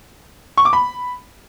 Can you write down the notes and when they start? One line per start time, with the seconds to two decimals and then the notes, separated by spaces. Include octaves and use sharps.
0.58 C#6
0.65 D6
0.73 B5